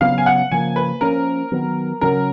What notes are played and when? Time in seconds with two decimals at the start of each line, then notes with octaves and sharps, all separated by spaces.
0.01 C#3 F#3 B3 F5
0.18 G#5
0.26 F#5
0.51 C#3 F3 A#3 G#5
0.76 B4
1.01 F3 A#3 C#4 A#4
1.52 D#3 F#3 B3
2.01 C#3 F#3 C#4 A#4